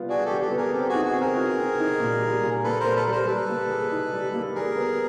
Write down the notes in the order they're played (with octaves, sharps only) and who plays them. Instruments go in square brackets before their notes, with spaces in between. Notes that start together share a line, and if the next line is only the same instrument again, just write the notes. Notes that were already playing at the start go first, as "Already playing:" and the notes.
Already playing: [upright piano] G3 B3 F4
[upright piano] D4 [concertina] F#4 G#4
[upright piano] G3 [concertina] G4 A4
[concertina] G4 A4
[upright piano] B3
[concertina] G#4 A#4
[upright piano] C4 [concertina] G4 A4
[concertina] F#4 G#4
[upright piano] D#4
[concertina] F#4 G#4
[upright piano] C4
[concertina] G#4 A#4
[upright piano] F#4
C4
D#4
A#2
G3
A#2
[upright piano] A#3 [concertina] A4 B4
[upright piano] A#2 [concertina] A#4 C5
[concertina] A4 B4
[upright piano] G3 [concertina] A#4 C5
[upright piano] G3 [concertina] A4 B4
[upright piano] A#3
G#4
D#4
G3
A#3
[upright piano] G3 [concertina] G#4 A#4
[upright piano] B3